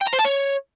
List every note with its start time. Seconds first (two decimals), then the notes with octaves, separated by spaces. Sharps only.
0.01 G5
0.07 A#5
0.13 C5
0.19 A5
0.25 C#5